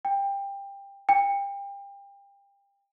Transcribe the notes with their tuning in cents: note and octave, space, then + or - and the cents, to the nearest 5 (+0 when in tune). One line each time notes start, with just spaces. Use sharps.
G5 +20
G5 +30